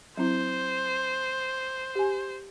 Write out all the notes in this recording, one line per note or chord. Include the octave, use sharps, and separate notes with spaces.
F#3 C4 E4 C5
G4 G#5